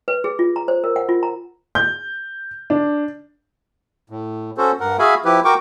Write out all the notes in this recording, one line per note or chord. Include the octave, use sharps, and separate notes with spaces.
B4
G#4
F4
A#5
C5
A#4
F#5
F4
A#5
G6
D4
A2
C#4 F#4 A4 C5
G2 A#4 F#5
F#4 G#4 E5 F5 G#5 B5
F3 E4 G4 B4
F#4 A#4 G5 C#6 D6